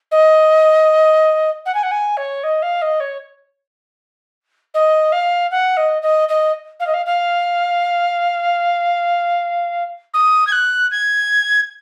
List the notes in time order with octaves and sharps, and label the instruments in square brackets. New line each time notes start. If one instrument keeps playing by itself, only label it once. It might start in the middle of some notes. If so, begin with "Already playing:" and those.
[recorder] D#5
F#5
G#5
F#5
G#5
C#5
D#5
F5
D#5
C#5
D#5
F5
F#5
D#5
D#5
D#5
F5
D#5
F5
F5
D#6
G#6
F#6
G#6